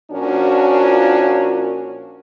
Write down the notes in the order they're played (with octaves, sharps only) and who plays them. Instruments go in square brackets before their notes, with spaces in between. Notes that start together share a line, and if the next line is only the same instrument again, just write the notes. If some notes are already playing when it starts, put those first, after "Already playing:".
[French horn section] A#2 F3 C#4 D4 F#4 A#4